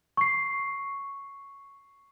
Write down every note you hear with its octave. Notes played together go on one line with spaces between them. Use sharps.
C#6 C7